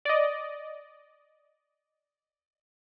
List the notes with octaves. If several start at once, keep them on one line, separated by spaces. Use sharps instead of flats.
D5 D#5